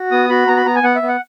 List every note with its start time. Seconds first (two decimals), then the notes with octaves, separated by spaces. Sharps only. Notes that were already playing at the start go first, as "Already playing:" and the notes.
Already playing: F#4
0.11 B3 D#6
0.29 F#4 B5
0.48 B3 A#5
0.57 B5
0.66 B3 A#5
0.75 G#5
0.83 B3 F#5
0.96 E5
1.02 B3
1.08 F#5